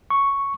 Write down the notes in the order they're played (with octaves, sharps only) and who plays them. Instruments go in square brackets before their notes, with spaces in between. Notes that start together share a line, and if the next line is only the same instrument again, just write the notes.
[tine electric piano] C#6